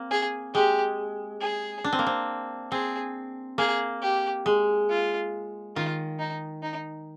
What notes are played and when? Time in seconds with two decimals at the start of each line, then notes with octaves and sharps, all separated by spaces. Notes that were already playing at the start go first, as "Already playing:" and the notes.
Already playing: A#3 C4
0.11 G#4
0.54 G#3 G4
1.41 G#4
1.84 D4
1.93 C4
1.99 A#3
2.07 C4
2.72 C4 G#4
3.58 A#3 G#4
4.02 G4
4.46 G#3
4.89 F4
5.76 D#3 F4
6.19 D#4
6.62 D#4